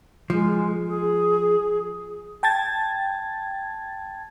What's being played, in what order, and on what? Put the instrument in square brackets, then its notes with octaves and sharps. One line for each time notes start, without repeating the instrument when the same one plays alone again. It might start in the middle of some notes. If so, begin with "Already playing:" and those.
[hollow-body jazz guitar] F3 [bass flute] G#3
[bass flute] G#4
[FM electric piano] G5 A5 G#6 A6